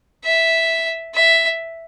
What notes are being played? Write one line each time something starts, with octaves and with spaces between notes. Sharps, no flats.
E5
E5